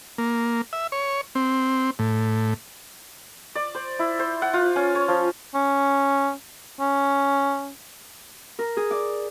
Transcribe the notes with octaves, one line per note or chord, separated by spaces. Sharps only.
A#3
E5
C#5
C4
A2
D5
C5
E4
C5
F#5
F4
C#4
C#5
F3
C#4
C#4
A#4
G#4
D5